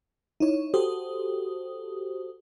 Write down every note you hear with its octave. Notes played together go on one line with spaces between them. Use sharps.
D#4 E4 C#5
F#4 G4 A4 C5 D#6